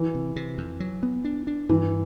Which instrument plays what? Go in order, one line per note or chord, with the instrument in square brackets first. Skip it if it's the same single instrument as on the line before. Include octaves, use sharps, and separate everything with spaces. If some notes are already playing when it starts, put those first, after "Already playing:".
Already playing: [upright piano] E3
[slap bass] C3
C3
F2
F#3
B3
D4
D4
[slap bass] G2 [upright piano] E3